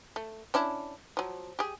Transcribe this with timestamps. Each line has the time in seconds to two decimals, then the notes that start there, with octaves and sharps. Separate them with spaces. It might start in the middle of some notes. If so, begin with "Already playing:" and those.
0.16 A3
0.54 C#4 D4 E4
1.17 F3 F#3
1.59 G4 G#4